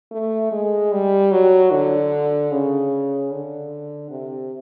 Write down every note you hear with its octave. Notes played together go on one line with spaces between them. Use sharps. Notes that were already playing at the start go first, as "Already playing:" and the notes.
A3
G#3
G3
F#3
D3
C#3
D3
C3